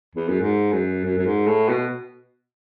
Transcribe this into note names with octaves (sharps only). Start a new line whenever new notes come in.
E2
F#2
G#2
F#2
F#2
F#2
G#2
A2
B2